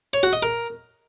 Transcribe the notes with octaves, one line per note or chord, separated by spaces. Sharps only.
C#5
F#4
D#5
A#4